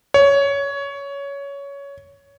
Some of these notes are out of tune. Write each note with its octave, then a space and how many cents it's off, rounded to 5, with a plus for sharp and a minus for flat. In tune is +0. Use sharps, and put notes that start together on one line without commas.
C#5 +15